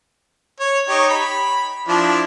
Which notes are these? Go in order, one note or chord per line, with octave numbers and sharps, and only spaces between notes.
C#5
D#4 G4 C#5
B5
F3 D4 E4